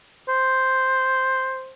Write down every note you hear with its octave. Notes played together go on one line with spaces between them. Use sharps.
C5